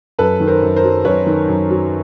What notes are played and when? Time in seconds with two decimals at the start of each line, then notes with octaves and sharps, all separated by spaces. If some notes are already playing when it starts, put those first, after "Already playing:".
0.19 F#2 A4 B4
0.40 D#3
0.47 A#4 C5
0.62 F#2
0.76 A#4 C5
0.84 F#3
1.05 F#2 B4 C#5
1.26 D#3
1.48 F#2
1.70 F#3